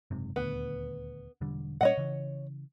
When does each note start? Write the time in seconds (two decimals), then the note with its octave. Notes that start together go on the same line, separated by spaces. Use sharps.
0.11 F#1 G#2 C3
0.36 D#1 D2 B3
1.41 E1 D3 G3
1.81 A#2 G3 C#4 C#5 D#5 F#5
1.97 C#3 E3